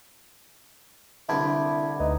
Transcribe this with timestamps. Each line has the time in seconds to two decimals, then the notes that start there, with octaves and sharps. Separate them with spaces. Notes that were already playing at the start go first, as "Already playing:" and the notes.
1.29 C2 D3 E4 A5 B5 G#6
2.00 D2 D#4 B4